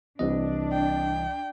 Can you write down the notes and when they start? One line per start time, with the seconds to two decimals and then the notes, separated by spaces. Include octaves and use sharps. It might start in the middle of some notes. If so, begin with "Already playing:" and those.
0.19 C2 C3 E3 D4 D#5
0.72 G5